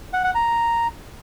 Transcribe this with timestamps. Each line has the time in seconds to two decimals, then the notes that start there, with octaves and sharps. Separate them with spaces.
0.13 F#5
0.24 F#5
0.35 A#5